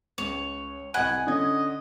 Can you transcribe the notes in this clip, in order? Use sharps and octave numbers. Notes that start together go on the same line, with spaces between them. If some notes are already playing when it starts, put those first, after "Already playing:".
C#2 C#5
C2 D#5 F#5 G#5 B5
D3 C#4 D#5 G#6